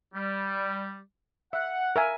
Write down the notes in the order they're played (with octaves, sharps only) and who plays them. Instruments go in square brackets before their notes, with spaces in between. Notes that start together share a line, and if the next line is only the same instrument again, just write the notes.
[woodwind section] G3
[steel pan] E5 [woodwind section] F#5
[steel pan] A#4 E5 G#5